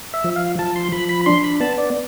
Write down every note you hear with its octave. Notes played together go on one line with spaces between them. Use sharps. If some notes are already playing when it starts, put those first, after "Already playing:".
E5
F3
F5
F3 A5
C6
F3 B5
B5
D4 C6
B5
B3 A5
D5